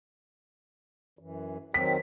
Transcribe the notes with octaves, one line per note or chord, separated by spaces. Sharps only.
F#2 E3
D#3 F#3 C4 B6